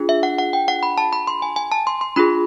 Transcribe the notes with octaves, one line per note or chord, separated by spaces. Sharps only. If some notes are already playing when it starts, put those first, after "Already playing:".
Already playing: D4 F4 G#4
E5
F#5
F#5
G5
F#5
B5
A5
B5
C6
G#5
G#5
A5
C6
C6
D4 F4 G#4 B5